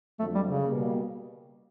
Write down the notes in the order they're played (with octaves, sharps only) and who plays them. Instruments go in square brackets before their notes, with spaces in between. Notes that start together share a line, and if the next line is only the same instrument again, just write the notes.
[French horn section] F2 D3 F#3 [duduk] A3
[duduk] G3
C#3
[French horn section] B2 G3 A#3